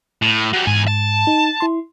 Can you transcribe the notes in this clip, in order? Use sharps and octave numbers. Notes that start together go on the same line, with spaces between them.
A2
F#3 G3
E2 G#2 G#5
A5
D#4
E4 C6